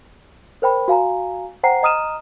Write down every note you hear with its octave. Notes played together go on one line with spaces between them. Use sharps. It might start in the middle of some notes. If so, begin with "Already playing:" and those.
A#4 C5 G5 B5
F#4 F5 G#5 A#5
C5 F#5 G5 A#5 C7
D#5 A#5 D#6 F6 D#7 E7